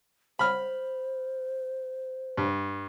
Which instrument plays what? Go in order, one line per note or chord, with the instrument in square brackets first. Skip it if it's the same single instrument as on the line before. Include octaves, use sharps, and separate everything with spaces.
[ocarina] C5 [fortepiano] B5 F6
[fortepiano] G2